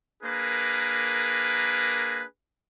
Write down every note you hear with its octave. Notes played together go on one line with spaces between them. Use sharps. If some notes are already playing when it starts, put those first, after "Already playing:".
A#3 D4 G#4 A#4 B4